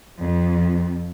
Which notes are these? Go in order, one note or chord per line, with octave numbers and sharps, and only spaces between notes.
F2